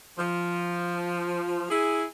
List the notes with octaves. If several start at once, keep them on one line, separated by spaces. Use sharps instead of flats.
F3
E4 G#4